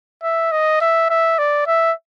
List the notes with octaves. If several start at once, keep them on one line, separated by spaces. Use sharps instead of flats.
E5
D#5
E5
E5
D5
E5